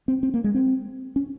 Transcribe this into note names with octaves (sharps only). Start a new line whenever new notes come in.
C4
C4
A#3
G#3
C4
C#4